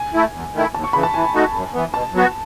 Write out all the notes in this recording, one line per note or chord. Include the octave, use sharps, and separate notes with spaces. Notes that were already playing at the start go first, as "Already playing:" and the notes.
Already playing: G#5
A3 E4
E2
D#3 A3 E4
D#2 A5
C#6
C#3 E3 B5
A5
E3 G#5
A3 D#4 F#4
F#2
E3 B3
B2 A5
F#3 B3 F#4